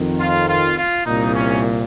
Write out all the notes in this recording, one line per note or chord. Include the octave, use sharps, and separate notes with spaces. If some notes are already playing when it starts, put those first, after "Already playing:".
Already playing: F2 D#3
F4
F4
F4
C2 A#2 D#4
C#4